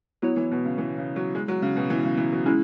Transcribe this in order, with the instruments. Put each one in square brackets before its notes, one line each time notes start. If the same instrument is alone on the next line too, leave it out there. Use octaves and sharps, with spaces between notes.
[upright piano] F#3 [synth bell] B3 E4 C#5
[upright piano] E3
B2
C#3
E3
C#3
F#3
G#3
F#3
C#3
B2
E3
C#3
E3
F#3
[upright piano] G#3 [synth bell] C#4 E4